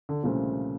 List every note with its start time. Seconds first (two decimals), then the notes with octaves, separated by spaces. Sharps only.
0.09 D3
0.23 C2 A#2 C#3 F3 A3 C4